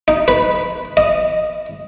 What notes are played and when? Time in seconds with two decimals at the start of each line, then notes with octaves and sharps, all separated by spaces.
0.08 D#4
0.28 B4
0.97 D#5